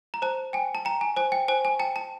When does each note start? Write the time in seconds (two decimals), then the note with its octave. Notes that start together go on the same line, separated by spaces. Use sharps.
0.14 A#5
0.22 C5 A5
0.53 G5 G#5
0.75 A5
0.85 G5 A#5
1.01 G#5
1.16 C5 G#5
1.32 G5
1.48 C5 G#5
1.65 G#5
1.79 G5 A5
1.96 A5